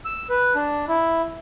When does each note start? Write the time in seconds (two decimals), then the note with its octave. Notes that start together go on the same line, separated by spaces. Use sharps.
0.05 E6
0.29 B4
0.55 D4
0.88 E4